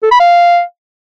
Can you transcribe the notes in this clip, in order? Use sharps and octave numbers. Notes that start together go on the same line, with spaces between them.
A4
B5
F5